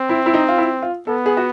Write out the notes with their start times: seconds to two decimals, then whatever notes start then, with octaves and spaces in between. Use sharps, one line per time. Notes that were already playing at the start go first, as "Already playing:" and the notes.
Already playing: C4
0.09 E4
0.26 E4
0.34 D#4
0.48 F4
0.58 E4
0.82 F4
1.07 B3 A4
1.26 G#4
1.37 F#4